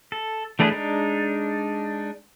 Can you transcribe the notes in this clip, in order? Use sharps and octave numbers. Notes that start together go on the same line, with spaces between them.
A4
E3 A3 D4 G#4 B4
G#3 D4 D#4